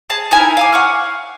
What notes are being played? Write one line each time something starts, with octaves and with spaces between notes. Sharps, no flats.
G#4 A5
D#4 E4 A#4 G#5
F5 G#5 D6
F#5 C#6 F6